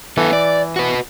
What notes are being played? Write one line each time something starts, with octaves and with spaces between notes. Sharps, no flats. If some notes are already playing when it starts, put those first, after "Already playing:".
E3 B3 A4
D5
F#4 B4